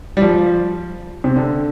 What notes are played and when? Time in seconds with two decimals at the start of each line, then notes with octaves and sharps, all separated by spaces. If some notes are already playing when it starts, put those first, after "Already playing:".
0.17 G3
0.22 F3
1.24 C3
1.36 D3